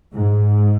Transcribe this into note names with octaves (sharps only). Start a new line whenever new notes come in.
G#2